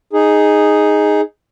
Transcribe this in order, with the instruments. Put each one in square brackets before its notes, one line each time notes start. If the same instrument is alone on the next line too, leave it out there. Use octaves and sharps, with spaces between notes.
[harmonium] D#4 G#4